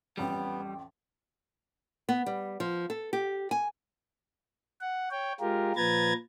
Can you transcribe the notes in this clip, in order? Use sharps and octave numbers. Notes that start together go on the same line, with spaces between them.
A1 F2 G3 B3 G5
B3
G3
F3
A4
G4
G#5
F#5
C#5 G5
G#3 F4 G4 A#4
A#2 F3 B4 A#5 G#6 A6